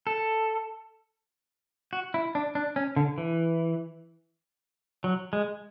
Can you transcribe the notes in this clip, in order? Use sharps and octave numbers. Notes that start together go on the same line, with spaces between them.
A4
F#4
E4
D4
D4
C#4
D3
E3
F#3
G#3